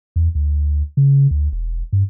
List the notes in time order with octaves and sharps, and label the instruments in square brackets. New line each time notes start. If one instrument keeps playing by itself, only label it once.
[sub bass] E2
D2
C#3
D2
E1
G2